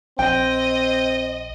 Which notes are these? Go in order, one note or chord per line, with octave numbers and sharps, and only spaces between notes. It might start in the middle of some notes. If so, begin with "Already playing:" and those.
A#1 C4 D#5 G5